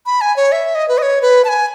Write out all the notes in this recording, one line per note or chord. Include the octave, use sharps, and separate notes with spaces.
B5
G#5
C#5
E5
D#5
B4
D#5
C#5
B4
A5
G#5